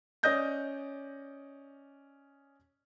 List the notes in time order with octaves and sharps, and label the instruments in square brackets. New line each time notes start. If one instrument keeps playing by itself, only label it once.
[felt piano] C#4 D5 D#5 D#6 G6 A#6